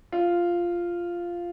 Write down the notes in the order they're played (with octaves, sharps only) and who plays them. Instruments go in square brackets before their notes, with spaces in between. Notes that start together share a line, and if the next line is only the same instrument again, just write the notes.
[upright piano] F4